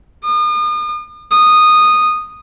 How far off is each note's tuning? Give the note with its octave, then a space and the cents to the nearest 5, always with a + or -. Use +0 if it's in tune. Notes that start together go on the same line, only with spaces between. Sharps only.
D#6 -40
D#6 -10